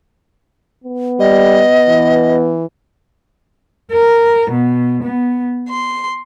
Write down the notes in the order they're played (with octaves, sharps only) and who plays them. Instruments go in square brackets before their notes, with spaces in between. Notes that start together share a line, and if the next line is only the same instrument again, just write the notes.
[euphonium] B3
[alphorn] G3 [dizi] D#5
[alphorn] E3
[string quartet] A#4
B2
B3
C6